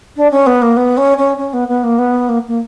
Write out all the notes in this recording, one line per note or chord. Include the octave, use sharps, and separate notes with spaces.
D4
C#4
B3
A#3
B3
C#4
C#4
C#4
B3
B3
A#3
B3
A#3
A#3